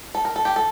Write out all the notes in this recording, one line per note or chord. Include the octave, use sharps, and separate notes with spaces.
A4
A#4
A4
G4
A4